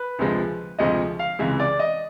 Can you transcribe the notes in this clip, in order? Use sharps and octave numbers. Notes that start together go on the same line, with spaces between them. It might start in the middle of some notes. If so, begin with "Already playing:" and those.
Already playing: B4
D2 C3 F3 G#3
D2 C3 F3 G#3 D#5
F5
C#2 C3 E3 G#3 E5
D5
D#5